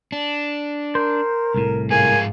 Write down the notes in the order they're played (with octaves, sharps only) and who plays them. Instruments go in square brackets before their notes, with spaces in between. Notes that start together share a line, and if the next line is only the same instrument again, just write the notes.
[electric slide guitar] D4
[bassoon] A#4 [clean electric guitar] C5
[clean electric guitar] C2 A2
[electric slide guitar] G#2 F4 G#4 [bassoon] A#3 [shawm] G#5